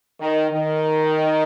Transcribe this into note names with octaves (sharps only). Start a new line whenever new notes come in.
D#3
D#3